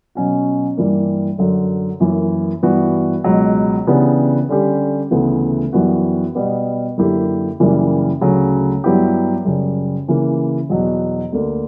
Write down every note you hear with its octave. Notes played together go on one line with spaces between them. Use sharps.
B2 F#3 C#4 F#4
G2 E3 G3 A#3
F#2 D3 F#3
F#2 E3 A#3
G2 E3 B3 F#4
C#2 B2 F#3
C#3 E3 B3 D4 G4
D3 G3 C#4 G4
D2 C#3 E3 B3
F#2 E3 G3 B3 F#4
B2 G3 B3
F#2 D3 A#3 E4 G4
F#2 C#3 E3 G3 A#3
D2 C#3 F#3
G2 F#3 B3 E4 G4
F#2 C#3 G3
C#3 E3 A#3
E2 B2 F#3
D2 D3 A#3